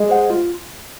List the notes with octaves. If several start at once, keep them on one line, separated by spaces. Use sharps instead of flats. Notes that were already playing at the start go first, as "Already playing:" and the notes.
Already playing: G#3
C5 F#5
F4